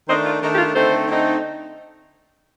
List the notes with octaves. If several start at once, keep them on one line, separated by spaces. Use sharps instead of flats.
D#3 A3 D4 C5 D#5
F4
D#3 A3 D4 D#4
G4
F4
D3 A3 C4 D#4 A4 C5
D3 A3 C4 D#4